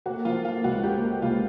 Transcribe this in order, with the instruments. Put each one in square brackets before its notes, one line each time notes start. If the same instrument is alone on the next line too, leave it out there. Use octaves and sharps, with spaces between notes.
[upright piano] A#3 [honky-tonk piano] F#4
[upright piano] F3 [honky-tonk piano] F4
[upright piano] A#3 [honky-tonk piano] F4
[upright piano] C#2 [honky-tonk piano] F#4
[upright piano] A#3 [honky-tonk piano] G4
[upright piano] A#3
[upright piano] C#2 [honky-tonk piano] F4